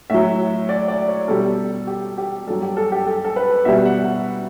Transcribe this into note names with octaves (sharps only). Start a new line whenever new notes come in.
A2 F#3 E5
D5
D5
C#5
B2 G3 A4
G4
G4
G2 F#3 A4
G4
A4
G4
A4
A4
B4
B2 G3 E5
F#5
F#5